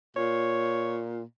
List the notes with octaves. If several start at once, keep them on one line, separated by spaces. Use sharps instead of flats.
A#2 C#5